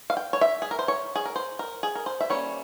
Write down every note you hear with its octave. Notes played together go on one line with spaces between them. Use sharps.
F5
G5
C#5
E5
G#4
A#4
C5
C#5
G#4
A#4
C5
A#4
G#4
A#4
C5
E5
G3 A#3 C#4 C#5